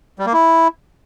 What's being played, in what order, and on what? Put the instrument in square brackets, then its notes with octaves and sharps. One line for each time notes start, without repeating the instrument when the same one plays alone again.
[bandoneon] G3
A#3
E4